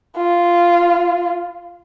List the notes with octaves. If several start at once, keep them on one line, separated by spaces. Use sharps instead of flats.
F4